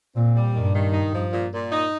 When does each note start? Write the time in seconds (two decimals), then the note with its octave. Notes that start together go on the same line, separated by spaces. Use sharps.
0.16 A#2 C4
0.36 G3
0.55 G2 D#3
0.75 D#3
0.94 D#4
1.14 F3
1.33 A#2
1.53 A#2
1.72 D#4